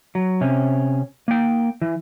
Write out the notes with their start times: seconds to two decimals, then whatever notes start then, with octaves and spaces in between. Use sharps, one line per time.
0.15 F#3
0.41 C3 C#4
1.28 A#3 G5
1.82 E3